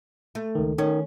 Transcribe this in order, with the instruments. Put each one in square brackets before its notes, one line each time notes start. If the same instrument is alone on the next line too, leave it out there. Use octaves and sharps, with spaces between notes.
[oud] A3
[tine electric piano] C#2 D#3
[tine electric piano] D#3 [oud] C#4